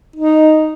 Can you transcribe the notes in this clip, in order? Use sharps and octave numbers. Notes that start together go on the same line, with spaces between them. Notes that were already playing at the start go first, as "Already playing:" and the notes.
D#4